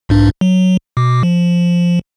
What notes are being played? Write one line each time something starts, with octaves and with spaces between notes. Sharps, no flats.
B1 G#2 D4
F#3
B2 D6
F3